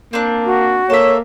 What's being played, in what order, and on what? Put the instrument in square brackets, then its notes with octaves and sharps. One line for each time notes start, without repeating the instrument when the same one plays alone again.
[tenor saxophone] A#3 [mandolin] C4 D4
[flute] F#4
[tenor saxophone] A#3 [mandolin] A4 E5 [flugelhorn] C#5